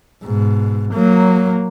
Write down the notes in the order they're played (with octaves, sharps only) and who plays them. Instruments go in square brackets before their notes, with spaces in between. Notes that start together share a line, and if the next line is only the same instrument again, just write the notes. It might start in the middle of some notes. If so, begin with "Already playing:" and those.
[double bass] G#2 B2
F#3 A#3